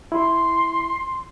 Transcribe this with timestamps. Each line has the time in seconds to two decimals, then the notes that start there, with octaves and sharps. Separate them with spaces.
0.12 E4 C6